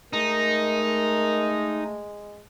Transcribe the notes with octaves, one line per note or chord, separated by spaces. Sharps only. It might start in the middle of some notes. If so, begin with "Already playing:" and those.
G#3 A3 D#4 A#4